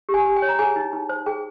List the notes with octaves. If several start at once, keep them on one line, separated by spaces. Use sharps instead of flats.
G4
G#5
G4 G#5
G5
C#5
A#5
G#4 G#5
D#4
D#4
C5
G#4 G5